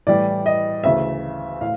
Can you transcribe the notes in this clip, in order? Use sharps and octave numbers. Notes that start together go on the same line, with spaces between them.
A2 E3 G3 D5
D#5
D2 C#3 E3 E5
A2 F5